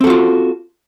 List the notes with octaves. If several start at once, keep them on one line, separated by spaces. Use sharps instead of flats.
C4 F4 F#4 A4